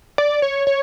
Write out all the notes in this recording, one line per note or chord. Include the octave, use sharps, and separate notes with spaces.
D5
C#5
C#5